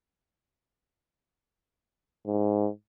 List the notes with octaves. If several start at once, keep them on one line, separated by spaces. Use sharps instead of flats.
G#2